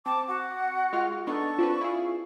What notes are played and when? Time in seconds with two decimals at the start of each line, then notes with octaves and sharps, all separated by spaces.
0.06 C4 A5 D6
0.28 F#4 F#5
0.93 G#3 F4 F6
1.27 B3 D4 D#4 A4 C#6
1.59 C4 D4 F4 B4
1.81 E4 G#4 F5